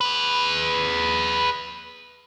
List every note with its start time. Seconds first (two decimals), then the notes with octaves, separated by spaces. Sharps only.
0.01 G#4 B4